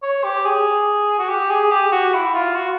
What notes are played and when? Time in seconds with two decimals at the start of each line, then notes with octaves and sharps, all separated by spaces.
0.03 C#5
0.24 G4
0.45 G#4
1.19 F#4
1.29 G4
1.50 G#4
1.71 G4
1.92 F#4
2.14 E4
2.34 F4
2.55 F#4